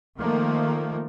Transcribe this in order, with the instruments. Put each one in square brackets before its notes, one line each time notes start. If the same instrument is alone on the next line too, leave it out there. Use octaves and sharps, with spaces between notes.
[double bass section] D#3 F3 A3 A#3